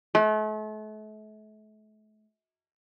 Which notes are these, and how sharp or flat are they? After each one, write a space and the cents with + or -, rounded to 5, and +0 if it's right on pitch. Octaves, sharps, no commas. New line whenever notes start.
A3 -40